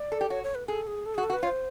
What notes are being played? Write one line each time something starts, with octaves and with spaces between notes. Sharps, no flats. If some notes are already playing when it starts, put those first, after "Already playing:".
Already playing: D5
A4
G4
F#4 C#5
C#5
B4
G#4 A4
G#4
A4
F#4 G#4
A4
F#4
B4
F4 C#5
C5